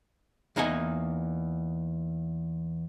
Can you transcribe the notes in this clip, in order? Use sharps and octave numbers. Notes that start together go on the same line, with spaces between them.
E2 A#3 D#4 F#5 G#5